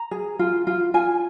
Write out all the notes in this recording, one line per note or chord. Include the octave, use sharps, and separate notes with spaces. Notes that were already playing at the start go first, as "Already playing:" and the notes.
Already playing: A#5
G#4
F4
F4
F4 G#5